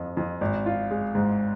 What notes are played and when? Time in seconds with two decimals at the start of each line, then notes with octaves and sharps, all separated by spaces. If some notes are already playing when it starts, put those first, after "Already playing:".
Already playing: F2 F3
0.17 F2
0.41 G#1
0.66 F4
0.91 G#3
1.15 G#2